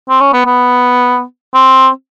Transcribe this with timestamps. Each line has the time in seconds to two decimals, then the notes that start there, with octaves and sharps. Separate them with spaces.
0.09 C4
0.20 C#4
0.33 B3
0.46 B3
1.54 C4